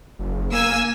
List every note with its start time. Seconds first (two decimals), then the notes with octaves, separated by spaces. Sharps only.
0.19 F#1
0.52 A#3 G#5 E6